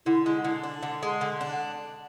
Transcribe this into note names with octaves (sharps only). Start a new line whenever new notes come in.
D3 E4
G#3
D3
D4
D3
G#3
D3
D4